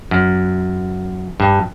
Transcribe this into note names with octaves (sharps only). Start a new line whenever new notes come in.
F#2
G2